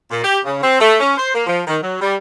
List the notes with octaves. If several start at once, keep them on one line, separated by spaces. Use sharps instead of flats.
A#2
G4
C#3
C4
A3
C#4
C5
A#3
F3
D#3
F#3
G3